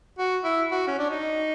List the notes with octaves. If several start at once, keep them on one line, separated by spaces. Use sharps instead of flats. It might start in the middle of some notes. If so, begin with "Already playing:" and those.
F#4
E4
F#4
C#4
D4
D#4